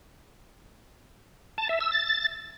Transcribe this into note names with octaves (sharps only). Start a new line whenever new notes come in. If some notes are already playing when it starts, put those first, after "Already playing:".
A5
E5
E6
A6